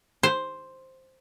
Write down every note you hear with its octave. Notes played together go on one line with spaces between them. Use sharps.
C5